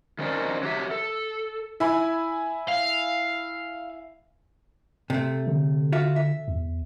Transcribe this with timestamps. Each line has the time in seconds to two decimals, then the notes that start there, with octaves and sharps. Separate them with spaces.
0.19 D#3 C4 C#4 A#4 D5
0.63 F#3 G4 E5
0.91 A4
1.80 E4 G#5 B5
2.68 F5
5.10 C3 A3
5.47 D3
5.92 F4 F#4 E5
6.16 E5
6.48 E2